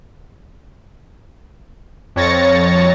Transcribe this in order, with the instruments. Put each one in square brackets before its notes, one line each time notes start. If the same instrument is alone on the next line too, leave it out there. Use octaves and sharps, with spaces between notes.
[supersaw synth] F2 C#5 A6 A#6 C#7